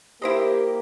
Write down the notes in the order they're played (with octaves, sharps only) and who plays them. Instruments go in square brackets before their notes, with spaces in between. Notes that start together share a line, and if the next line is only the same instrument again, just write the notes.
[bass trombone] A#3 [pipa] E4 C5 D#5 [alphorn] G4